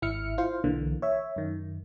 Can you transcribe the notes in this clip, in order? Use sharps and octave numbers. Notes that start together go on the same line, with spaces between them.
G#1 E4 E5 F6 C#7
E4 F4 C5 F5
B1 D3 E3 A#3
C#5 E5
F#2 D#3